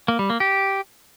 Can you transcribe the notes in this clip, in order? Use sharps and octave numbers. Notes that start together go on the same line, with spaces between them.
A#3
G3
A#3
G4